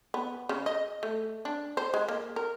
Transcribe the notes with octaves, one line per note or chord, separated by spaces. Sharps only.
B3
C#3
D#5
A3
D4
C5
G#3
A#3
A#4